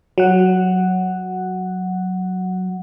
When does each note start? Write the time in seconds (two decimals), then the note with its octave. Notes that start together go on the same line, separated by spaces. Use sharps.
0.18 F#3 F#5